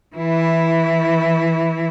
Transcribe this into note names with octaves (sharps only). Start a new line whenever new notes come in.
E3 E4